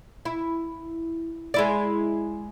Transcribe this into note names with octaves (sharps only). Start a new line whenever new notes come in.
E4
G#3 E4 D5